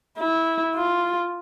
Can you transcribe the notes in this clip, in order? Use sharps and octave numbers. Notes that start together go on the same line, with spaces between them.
E4
F4